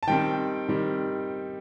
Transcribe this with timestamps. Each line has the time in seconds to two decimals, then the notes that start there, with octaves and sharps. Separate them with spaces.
0.03 A5
0.07 D#3 G3 C4 G5
0.68 D#3 G3 C4